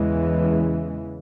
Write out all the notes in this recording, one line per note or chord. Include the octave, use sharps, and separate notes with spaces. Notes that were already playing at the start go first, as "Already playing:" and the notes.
Already playing: E2 C#3 E3 G#3